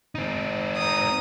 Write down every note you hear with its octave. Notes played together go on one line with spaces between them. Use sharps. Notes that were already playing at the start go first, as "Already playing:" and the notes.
C4 D#4
A#5 D#6